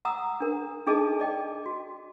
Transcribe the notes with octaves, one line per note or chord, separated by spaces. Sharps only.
F#5 A#5 D#6 E6
D4 A#4
D4 D#4 G#4 A4 D#5 A5
D5 D#5 G5
F#4